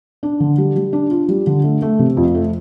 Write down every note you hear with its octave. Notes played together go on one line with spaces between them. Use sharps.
D4
D3
G3
G3
D4
F4
G3
D3
A3
A3
C3
F2
A3